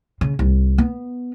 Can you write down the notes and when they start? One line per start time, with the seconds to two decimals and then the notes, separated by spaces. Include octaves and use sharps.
0.21 C#3
0.39 C2
0.78 B3